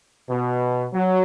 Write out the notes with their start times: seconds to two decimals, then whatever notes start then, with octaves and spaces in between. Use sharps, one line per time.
0.29 B2
0.94 F#3